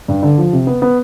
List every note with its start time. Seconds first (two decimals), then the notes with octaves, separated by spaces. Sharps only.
0.08 G2
0.23 D3
0.38 F3
0.53 C3
0.67 B3
0.82 B3